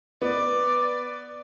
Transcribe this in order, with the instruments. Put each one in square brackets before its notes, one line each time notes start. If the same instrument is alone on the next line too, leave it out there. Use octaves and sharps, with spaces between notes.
[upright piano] B3 [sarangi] D5